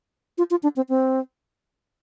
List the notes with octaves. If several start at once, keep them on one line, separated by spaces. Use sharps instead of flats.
F4
F4
D4
C4
C4